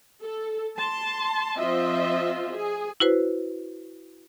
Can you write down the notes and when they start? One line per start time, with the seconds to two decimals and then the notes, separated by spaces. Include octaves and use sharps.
0.22 A4
0.78 A5 C6
1.58 F3 C4 F4 D#5 E5
2.52 G#4
3.00 E4 F#4 B4 C5